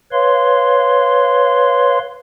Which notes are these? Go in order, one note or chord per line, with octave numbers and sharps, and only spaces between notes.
B4 C#5 F5 C6